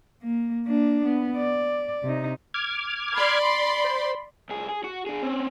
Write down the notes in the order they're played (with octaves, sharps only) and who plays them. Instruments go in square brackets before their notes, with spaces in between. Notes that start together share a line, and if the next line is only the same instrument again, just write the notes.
[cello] A#3
A#3 D4
B3
D5
C3 D#4
[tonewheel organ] D6 F6 G#6
[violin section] D5 B5 C6
[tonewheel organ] C5
[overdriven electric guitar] C2 G#4
G#4
F#4
D4 G#4
C4 C#4